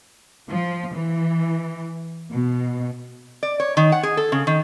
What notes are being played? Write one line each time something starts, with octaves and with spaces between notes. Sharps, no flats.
F3
E3
B2
D5
C#5
D#3
F#5
G#4
A4
C#3
D#3